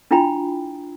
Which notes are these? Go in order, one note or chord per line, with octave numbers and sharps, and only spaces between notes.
D4 E4 F4 G5 A#5 B5